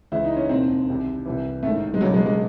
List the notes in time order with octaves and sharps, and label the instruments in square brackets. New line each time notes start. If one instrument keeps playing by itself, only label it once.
[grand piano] C#2 C#3 E3 E4
D#4
C#4
E1 D#2 D#3 C4
C2 C3 D#3
C2 C3 E3
A1 G#2 D#3 A3
G#3
E1 E2 C#3 F#3
G#3
G#3